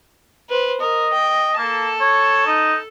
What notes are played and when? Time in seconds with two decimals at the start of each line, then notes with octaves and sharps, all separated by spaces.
0.49 B4 C5
0.81 A#4 D#5
1.13 G5
1.58 A#3 A4 A5
2.01 C#5
2.47 D#4